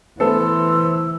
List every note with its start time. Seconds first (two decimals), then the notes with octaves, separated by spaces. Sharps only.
0.20 E3 A3 B3 A4 C5 E6